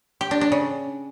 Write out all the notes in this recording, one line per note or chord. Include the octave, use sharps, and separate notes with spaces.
G4
D4
D4
C#3